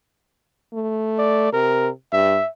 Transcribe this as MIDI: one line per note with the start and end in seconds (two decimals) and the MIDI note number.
0.73 1.51 57
1.18 1.48 74
1.53 1.89 48
1.53 1.89 70
2.13 2.38 43
2.13 2.49 76